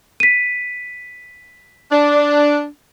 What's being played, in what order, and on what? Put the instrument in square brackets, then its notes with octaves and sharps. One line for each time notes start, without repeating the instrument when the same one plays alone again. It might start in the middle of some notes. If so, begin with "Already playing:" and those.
[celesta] B6 D#7
[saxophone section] D4